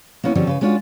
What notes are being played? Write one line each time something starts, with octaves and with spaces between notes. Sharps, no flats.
A#3 B3 C#4 E4
D3 F3 G3 C4 C#4 F#4
C#3 B4
G#3 C#4 D4 F4 F#4